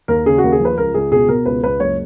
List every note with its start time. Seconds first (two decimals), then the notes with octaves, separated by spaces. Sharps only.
0.08 D#2 A#4
0.26 C#3 G#4
0.38 F#4
0.44 D#2
0.52 G#4
0.60 F3 B4
0.78 C#2 A#4
0.94 C#2 G#4
1.12 B2 G#4
1.28 B2 A#4
1.46 C#2 B4
1.63 C#2 B4
1.80 F#1 C#5